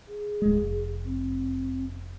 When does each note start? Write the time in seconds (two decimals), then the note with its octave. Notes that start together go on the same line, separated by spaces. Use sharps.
0.08 G#4
0.42 D1 G#3
0.62 F1
1.05 C4